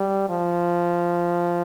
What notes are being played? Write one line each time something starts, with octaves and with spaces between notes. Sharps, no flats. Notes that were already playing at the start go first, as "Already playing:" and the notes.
Already playing: G3
F3